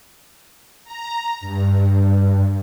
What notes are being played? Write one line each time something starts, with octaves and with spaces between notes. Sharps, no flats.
A#5
G2